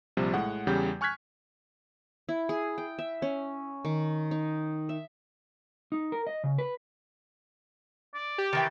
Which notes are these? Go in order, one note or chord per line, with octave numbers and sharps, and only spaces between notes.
A#1 C3 F3 G3
A2 G#3 F#5
E2 C#3 G3 G4 G5 G6
G#5 C#6 F6 F#6 G#6 B6
E4
G#4
G5
E5
C#4
D#3
D#4
E5
D#4
A#4
D#5
C#3
B4
D5
G4
D#3 E3 G5 A5